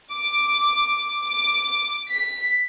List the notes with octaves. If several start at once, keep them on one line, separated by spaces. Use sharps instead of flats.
D6
D6
B6